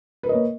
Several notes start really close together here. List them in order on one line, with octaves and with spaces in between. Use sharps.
B4 A#4 D#5 C#5 A#3